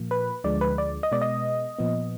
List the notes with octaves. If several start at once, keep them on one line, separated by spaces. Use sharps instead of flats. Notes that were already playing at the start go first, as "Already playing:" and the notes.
Already playing: A#2 F3 A#3
B4
D2 D3 F3 G#3 D5
B4
D5
D#5
B2 G#3 B3 D5
D#5
A#2 F3 B3